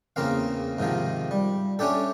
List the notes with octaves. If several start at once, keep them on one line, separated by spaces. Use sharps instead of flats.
E2 C#3 A#3 C4 F5
G#2 C3 D#3 F3
G3
A3 C#4 D4 G4 A4